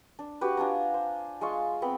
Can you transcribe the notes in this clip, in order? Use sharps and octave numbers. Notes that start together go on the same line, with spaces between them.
D4
F#4 G4 B4
D4 F4 G#5 A#5
C5
G#3 F4 C6 C#6
B3 C4 B5